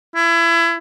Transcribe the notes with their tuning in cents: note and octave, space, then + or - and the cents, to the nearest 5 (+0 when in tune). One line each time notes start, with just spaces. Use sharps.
E4 +30